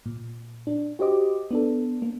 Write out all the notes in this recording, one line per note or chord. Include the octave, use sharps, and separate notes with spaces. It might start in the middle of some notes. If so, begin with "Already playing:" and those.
A#2
D4
F#4 G4 C5 D#5 D6
B3 D4 A4
A#3